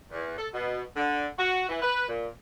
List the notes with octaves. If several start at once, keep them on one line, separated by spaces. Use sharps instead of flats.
E2
A4
B2
D3
F#4
E3
B4
A#2